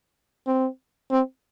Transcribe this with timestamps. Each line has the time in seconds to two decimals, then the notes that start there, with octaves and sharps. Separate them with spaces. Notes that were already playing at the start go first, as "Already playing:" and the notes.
0.47 C4
1.11 C4